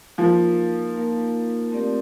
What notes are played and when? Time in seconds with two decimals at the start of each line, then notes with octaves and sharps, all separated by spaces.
0.18 F3 A#3 D#4 A#4 F5
0.95 A#3 D#4 A#4 F5
1.72 A3 C4 G4 A#4 D5